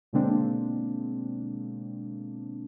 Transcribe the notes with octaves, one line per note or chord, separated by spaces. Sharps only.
B2 D3 G#3 A#3 C4 D4